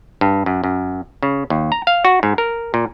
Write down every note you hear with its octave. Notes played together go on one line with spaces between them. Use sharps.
G2
F#2
F#2
C#3
D#2
A#5
F5
F#4
G#2
A#4
A#2